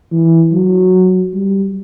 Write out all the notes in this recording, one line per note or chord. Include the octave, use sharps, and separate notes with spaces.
E3
F#3
G3